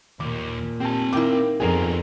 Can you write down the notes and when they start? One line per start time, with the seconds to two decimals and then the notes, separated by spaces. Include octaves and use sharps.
0.20 D#2 A#2 D6
0.80 C4 G4 G#5 A5
1.13 D#3 A#3 E4 G5 D6
1.60 F2 B3 F4 G#4 A#4